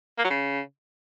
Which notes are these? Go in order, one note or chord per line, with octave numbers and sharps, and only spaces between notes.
A#3
F#3
C#3